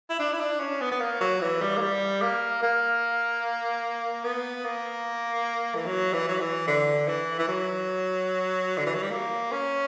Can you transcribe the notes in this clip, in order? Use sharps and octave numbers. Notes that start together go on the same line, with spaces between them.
E4
D4
E4
D4
C#4
B3
B3
A#3
F#3
E3
G3
A#3
G3
A#3
A#3
B3
A#3
E3
F#3
E3
F#3
E3
D3
E3
E3
F#3
D3
E3
F#3
G3
A#3
C#4